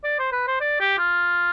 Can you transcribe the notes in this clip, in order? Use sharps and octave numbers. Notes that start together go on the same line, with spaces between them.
D5
C5
B4
C5
D5
G4
F4